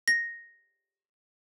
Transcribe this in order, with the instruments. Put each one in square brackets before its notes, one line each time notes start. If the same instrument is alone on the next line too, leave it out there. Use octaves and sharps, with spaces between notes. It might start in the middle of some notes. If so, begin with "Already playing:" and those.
[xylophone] A#6